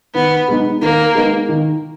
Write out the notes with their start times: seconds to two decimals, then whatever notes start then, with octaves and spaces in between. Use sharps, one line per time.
0.14 D#3 B3
0.48 G#3 B3 D#4
0.81 D#3 A#3
1.15 G#3 B3 D#4
1.49 D#3